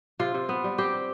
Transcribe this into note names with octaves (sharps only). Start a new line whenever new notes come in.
C3 F4
C3
B3
G3
C4 G4